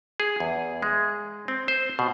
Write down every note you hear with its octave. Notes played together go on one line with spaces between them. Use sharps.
G#4
E2
G#3
C4
C5
B2